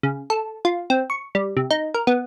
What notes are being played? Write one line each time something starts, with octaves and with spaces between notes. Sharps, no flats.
C#3
A4
F4
C4
C#6
G3
C3
D#4
A#4
B3